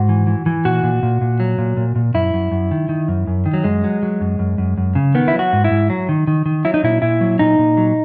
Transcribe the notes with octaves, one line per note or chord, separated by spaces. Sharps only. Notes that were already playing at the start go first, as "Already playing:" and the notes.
Already playing: G#2 F#4
E3
E3
E3
A#2 F#4
A#2
A#2
A#2
F#3
A#2
A#2
A#2
F#2 E4
F#2
F#2
D#3
D#3
F#2
F#2
D#3
F#3
F#2 G#3
F#3
F#3
F#2
F#2
F#2
F#2
C#3
D#3 B3
E4
F#3
F#4
G#2
E4
G#2
F#3
D#3
D#3
D#3
F#3 E4
D#4
A#2 E4
A#2 E4
F#3
A#2 D#4
A#2
F#3